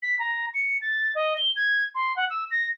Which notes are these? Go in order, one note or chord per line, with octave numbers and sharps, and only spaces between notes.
B6
A#5
C#7
A6
D#5
G7
G#6
C6
F#5
E6
A#6